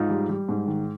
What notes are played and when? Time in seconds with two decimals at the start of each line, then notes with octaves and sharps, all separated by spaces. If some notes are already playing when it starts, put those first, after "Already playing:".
Already playing: G#2 D#4 F4
0.10 G3
0.29 G3
0.49 G#2
0.67 D#3